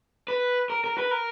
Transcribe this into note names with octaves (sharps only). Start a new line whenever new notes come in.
B4
A#4
A#4
B4
A#4